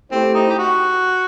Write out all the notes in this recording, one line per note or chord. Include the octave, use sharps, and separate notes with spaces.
A3 C4 E4 G4 C5
D#4
G4
F#4